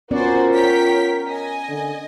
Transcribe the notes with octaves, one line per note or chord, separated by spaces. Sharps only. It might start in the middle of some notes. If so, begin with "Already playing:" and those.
B3 C#4 F4 F#4 A#4 C5 D5
C#5 G5 B6
D#5 G#5
D3